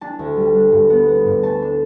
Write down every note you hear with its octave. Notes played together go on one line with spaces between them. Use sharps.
D4 A5
D2
G3
D4
G2
B3
B3
G2
A3 A5
D4